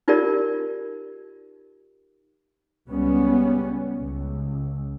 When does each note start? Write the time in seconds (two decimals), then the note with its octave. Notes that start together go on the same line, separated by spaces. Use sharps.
0.08 D#4 F4 G4 A#4 D5
2.89 C#2 G3 B3 C#4
4.00 C#2